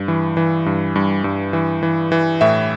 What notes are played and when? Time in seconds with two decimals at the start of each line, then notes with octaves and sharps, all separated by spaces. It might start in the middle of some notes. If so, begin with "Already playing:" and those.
Already playing: G2
0.08 E3
0.37 E3
0.66 G2
0.96 G2
1.24 G2
1.53 E3
1.83 E3
2.12 E3
2.41 A2 E5